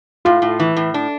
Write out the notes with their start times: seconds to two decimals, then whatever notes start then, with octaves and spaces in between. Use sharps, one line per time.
0.25 A2 F4
0.42 A2
0.60 E3
0.77 A2
0.94 D4